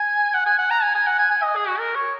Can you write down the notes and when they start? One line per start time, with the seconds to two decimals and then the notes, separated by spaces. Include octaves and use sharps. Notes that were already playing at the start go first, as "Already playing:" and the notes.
Already playing: G#5
0.34 F#5
0.46 G#5
0.59 F#5
0.70 A#5
0.82 G#5
0.95 G#5
1.07 F#5
1.19 G#5
1.31 G#5
1.43 D#5
1.56 G#4
1.68 F#4
1.79 A#4
1.95 C#5